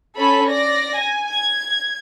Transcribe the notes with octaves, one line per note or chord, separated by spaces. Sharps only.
C#4 A4 B5
D5 A#6
G#5
G#6